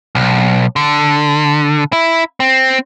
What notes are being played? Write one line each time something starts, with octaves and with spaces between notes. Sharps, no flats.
B1
D3
E4
C4